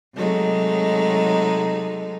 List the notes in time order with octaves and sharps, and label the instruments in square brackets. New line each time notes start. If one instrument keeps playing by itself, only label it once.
[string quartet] C3 F#3 G#3 A3 D#4